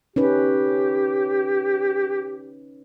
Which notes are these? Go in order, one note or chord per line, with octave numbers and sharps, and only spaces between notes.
C#4 D#4 G4 B4